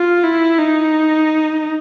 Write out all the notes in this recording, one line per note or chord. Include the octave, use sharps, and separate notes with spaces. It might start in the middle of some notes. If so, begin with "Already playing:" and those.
Already playing: F4
E4
D#4